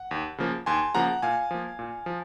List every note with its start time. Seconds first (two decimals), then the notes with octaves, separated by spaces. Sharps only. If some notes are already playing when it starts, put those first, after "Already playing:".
Already playing: F#5
0.11 D#2
0.38 C#3 F3 A#3
0.66 D#2 G#5 C6
0.95 C#3 F3 A#3 F#5 A#5
1.22 A#2 F5 G#5
1.51 F3 A#3
1.79 A#2
2.06 F3